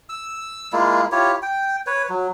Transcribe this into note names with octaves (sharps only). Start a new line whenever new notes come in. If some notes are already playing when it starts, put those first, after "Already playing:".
E6
G#3 A#3 E4 F4
E4 F4 G4 C#5
G5
B4 C#5
F#3